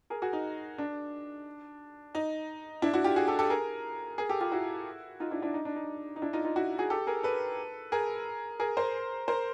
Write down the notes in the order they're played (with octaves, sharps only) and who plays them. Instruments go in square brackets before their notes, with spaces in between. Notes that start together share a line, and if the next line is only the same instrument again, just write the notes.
[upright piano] G#4 A#4
F#4 G#4
D#4
D4
D#4
D4 E4
E4 F#4
F4 G4
F#4 G#4
G4 A4
G4 A4
G#4 A#4
G#4 A#4
G4 A4
F4 G4
E4 F#4
D#4 F4
D4 E4
D4 E4
D#4
D4
D#4
D#4
D4 E4
D#4 F4
D#4 F4
E4 F#4
F#4 G#4
G4 A4
G#4 A#4
A4 B4
G#4 A#4
G#4 A#4
A#4 C5
A#4 C5